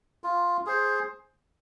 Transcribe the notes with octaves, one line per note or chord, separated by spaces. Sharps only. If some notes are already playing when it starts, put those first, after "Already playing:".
F4
G#4 C5